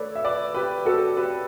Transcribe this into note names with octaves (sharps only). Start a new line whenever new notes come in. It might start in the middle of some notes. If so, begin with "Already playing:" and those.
Already playing: A3 A4 B4 C#5 D5
E5
B4 D5
G4 B4
F#4 A4
G4 B4